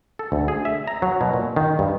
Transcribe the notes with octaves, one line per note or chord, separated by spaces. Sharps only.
A4
D2
G#4
E5
A#5
F#3
B2
A#2
D#3
G2